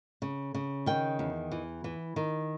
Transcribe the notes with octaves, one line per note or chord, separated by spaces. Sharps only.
C#3
C#3
D#3 G5
E2
E3
E3
D#3